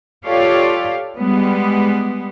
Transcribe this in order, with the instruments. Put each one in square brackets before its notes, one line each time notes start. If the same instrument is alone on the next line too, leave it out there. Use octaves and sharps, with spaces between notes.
[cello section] F4 G4 A4 C#5 D5 F5
G3 G#3 B3